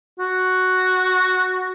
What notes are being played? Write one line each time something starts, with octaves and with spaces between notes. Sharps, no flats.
F#4